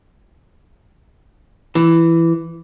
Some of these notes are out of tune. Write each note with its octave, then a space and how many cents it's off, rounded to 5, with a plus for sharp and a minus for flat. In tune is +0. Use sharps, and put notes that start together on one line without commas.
E3 +10